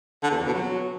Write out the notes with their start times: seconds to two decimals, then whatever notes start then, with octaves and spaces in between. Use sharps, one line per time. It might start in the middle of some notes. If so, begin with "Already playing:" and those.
0.23 D3
0.31 E2
0.38 F2
0.46 B2
0.53 F#3